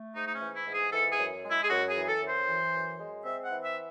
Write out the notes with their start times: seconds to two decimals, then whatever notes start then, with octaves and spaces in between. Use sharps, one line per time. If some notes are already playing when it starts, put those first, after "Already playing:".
Already playing: A3
0.16 G#2 D#4
0.27 D#4
0.35 C#4
0.41 E3
0.55 E4
0.67 G#2
0.73 G#4
0.92 E3 A4
1.12 G#4
1.18 F#2
1.44 G#3
1.51 E4
1.64 G#4
1.70 F#2 F#4
1.89 G#4
1.96 E3
2.08 A4
2.21 F#2
2.28 C5
2.47 E3
2.73 F#2
2.99 G#3
3.24 C4 E5
3.44 F#5
3.50 E3
3.64 E5